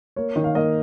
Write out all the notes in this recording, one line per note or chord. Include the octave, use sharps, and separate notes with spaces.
A#3 C#5
D#3
F5
A#3 D#5